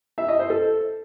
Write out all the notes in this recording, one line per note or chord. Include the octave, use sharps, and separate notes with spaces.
E5
D#5
C5
A4